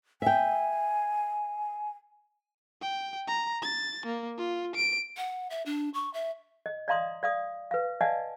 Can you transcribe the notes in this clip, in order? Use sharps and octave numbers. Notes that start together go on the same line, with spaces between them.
E5 G5 G#5
G5
A#5
A6
A#3
F4
D7
F#5
E5
D4
C#6
E5
D#5
D5 D#5 F5 A#5 C6 D#6
D5 F5 D#6
B4 F5
D5 D#5 F5 F#5 G#5 A5